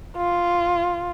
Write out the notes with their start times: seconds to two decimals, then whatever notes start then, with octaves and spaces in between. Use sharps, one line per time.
0.16 F4